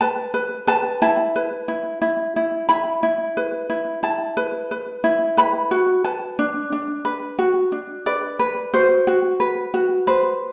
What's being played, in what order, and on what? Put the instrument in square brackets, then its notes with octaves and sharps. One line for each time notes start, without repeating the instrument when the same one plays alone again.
[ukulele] B4 A5
B4
B4 A5
E4 A5
B4
E4
E4
E4
E4 B5
E4
B4
E4
E4 A5
B4
B4
E4
B4 B5
F#4
B4 A5
D4
D4
B4
F#4
D4
B4 D5
B4
F#4 C5
F#4
B4
F#4
B4 C5